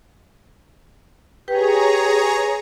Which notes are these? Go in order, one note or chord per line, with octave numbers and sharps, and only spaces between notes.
G4 G#4 B4 C#5 G5 A#5